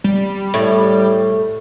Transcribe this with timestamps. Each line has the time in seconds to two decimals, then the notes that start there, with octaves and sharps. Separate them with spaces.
0.04 G3
0.54 A2